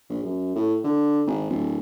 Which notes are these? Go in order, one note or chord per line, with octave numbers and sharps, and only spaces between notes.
A#1
F#2
A2
D3
G#1
D1